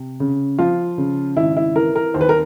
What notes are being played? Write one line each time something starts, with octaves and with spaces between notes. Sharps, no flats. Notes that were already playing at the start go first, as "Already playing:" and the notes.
Already playing: C3
C#3
F3 F4
C#3
G#1 E4
E4
E3 A#4
A#4
D#2 C5
B4
A#4